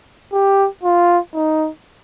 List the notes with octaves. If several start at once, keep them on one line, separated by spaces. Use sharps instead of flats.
G4
F4
D#4